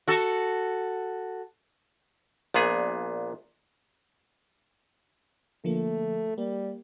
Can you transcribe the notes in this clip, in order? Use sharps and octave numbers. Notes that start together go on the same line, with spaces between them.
F#4 A4
A#1 A#2 B3 G#4
D3 F3 A3 A#3
G3 A#3